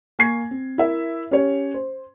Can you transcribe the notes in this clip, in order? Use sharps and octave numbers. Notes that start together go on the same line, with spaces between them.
A#3 G#5 C#6 G#6 C7
C4
E4 A#4 E5
C#4 G4 C#5
C5